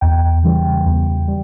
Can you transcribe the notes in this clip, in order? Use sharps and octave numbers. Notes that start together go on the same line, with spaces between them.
E2 G5
C#3 E3 G3
E2
G3